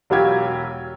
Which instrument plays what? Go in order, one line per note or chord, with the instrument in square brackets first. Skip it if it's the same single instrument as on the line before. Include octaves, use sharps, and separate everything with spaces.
[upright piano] E1 F#3 F4 G4 G#6